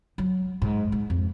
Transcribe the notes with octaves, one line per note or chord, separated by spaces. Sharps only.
F#3
G#2
G#2
F2